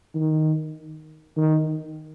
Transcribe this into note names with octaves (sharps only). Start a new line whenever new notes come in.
D#3
D#3